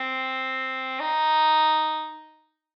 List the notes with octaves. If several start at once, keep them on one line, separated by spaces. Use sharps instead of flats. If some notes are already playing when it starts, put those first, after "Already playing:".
Already playing: C4
D#4